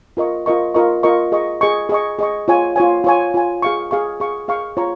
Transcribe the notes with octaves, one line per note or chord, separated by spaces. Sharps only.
F4 A#4 D#5 C#6
F4 A#4 D#5 C#6
F4 A#4 D#5 C#6
F4 A#4 D#5 C#6
G#4 D#5 C#6
G#4 D#5 C#6
G#4 D#5 C#6
G#4 D#5 C#6
F4 C#5 G#5
F4 C#5 G#5
F4 C#5 G#5
F4 C#5 G#5
G#4 F5 C#6
G#4 F5 C#6
G#4 F5 C#6
G#4 F5 C#6
F4 C#5 A#5 C#6